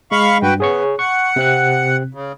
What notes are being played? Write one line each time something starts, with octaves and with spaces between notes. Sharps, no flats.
G#3 F5 B5 C#6
G2 F#4 B4 G5
B3 G#4 C#5 C#6
F#5 C#6
C3 C4 F#6
C#3